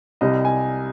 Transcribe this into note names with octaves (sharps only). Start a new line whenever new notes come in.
C2 C3 G3 D#5
G#5